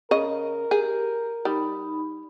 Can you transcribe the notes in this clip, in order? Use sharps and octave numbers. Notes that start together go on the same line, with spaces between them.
C#3 A#4 D#5
G4 G#4
G3 D#4 B5